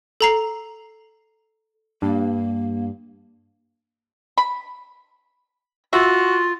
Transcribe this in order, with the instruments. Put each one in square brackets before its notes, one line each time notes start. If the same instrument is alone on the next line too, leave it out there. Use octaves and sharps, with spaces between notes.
[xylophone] A4 A#5 C7
[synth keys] G2 [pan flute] A#3
[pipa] B5
[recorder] F4 [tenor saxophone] F#4 [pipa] E5